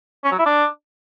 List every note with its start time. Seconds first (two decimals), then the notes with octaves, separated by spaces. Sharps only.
0.24 C#4
0.31 F#3
0.39 E4
0.46 D4